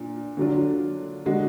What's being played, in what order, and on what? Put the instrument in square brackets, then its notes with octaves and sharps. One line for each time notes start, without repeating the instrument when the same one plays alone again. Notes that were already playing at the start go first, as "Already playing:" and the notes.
Already playing: [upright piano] A#2 D4
D3 F#3 D4 F4
D3 G#3 D4 F#4